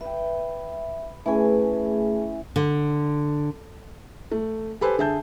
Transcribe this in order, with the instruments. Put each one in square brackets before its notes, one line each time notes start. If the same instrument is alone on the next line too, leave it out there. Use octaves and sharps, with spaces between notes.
[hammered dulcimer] B4 G5 [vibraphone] E5
[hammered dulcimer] E3 C#4 G#5 [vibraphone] A3 G#4
[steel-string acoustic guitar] D3
[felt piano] A3
G4 A4 B4 C5 G#5
D3 G#4 E5 A5 G6